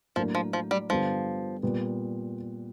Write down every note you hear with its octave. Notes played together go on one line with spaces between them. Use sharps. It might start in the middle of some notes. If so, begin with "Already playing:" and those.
A2 F3 F#3 A#3 D4
F3
F3
G3
G2 D3 F3 G3 B3
A#2 G3 B3